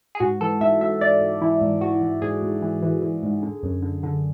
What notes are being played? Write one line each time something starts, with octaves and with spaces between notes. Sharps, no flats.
G#4
G#2 F#4
E3 A4
G#2 E5
G#2 E5
G#2 D5
G#2
E3 E4
G#2
G#2 F#4
E3
G#2 G#4
G#2
E3
E3
E3
G#2
D3
F#2
D3
D3